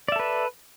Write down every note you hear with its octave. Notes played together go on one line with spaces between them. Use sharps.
A4 B4 D5 E5